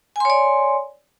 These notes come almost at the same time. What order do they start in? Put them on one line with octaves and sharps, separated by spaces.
G#5 C6 C#5 D5